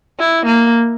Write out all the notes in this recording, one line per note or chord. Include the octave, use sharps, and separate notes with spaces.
E4
A#3